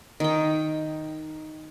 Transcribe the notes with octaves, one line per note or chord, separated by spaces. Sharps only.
D#3 G5